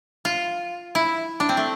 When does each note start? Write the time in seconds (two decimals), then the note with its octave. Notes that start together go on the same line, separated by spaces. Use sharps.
0.25 F4
0.95 E4
1.40 D4
1.49 C4
1.57 A3